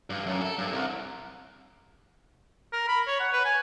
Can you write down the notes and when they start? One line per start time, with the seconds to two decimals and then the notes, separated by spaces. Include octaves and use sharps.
0.10 G2
0.26 F#2
0.41 A4
0.58 G2
0.73 C2
2.73 A#4
2.88 B5
3.07 C#5
3.20 F#5
3.33 B4
3.45 G#5